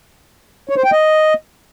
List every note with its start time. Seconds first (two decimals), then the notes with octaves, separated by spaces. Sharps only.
0.69 C#5
0.77 C5
0.84 G5
0.92 D#5